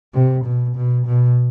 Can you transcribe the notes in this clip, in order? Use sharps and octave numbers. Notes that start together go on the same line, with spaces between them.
C3
B2
B2
B2